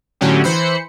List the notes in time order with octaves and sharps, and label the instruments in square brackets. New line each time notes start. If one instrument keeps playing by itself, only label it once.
[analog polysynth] A2 D3 F#3 C#4 G4
E3 C5 B5 C#7